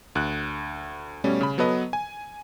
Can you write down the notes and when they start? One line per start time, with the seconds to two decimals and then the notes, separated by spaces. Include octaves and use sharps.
0.15 D2 F#6
1.24 B2 G3 A3 C#4
1.41 C#3 B5
1.58 F#3 B3 A4 B4 D#5
1.93 G#5